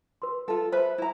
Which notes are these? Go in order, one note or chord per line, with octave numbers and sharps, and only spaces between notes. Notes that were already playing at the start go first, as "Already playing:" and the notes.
B4 C6
F4 A4
B4 C5 E5 B5
E4 A#5